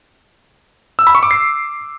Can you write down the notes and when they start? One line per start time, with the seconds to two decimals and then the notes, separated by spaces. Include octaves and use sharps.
0.99 E6
1.07 B5
1.15 C#6
1.23 D6
1.31 C7